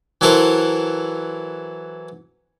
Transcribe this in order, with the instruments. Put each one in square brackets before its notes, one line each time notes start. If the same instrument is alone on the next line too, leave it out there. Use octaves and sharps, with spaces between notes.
[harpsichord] E3 F#3 E4 A4 A#4 C5